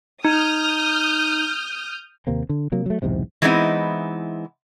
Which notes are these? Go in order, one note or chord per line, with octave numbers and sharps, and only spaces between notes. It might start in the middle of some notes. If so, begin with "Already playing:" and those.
D#4 D#6 F6 G6
D#2 C3 A#3 C4
D3
C3 F#3 A#3
F#3 A3
B1 E2 G#2 C3
E3 G#3 B3 C4 D#4 E4